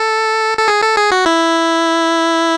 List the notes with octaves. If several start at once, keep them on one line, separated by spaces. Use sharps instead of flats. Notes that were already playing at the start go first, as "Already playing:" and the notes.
Already playing: A4
A4
G#4
A4
G#4
F#4
E4